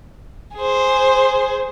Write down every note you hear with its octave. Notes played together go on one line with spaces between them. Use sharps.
G#4 C5